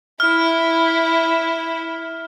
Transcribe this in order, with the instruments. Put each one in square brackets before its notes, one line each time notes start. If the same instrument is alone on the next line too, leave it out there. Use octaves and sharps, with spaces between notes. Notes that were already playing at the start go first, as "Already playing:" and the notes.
[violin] E4 [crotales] F6